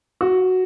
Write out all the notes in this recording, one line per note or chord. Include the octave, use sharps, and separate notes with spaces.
F#4